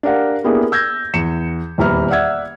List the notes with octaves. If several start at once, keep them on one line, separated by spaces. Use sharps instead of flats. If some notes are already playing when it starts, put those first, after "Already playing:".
D4 G4 A#4 F5 F#5
A#3 B3 D4 E4 G4 G#4
E6 G6 G#6 A#6
E2 C#7 E7
D#1 E2 E3 A#5 B5 F6
D5 E5 F#5 E6 G#6